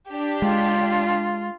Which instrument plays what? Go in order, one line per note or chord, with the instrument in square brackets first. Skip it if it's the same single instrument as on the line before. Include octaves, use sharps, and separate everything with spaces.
[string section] D4 G4
[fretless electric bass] G#3 [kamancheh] F4